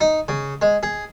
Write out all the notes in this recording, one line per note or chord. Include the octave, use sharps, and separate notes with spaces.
D#4
C#3
G#3
G#4